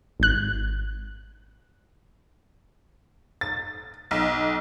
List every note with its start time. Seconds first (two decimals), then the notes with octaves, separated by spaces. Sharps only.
0.20 G#1 F#6
3.41 A6
4.11 B1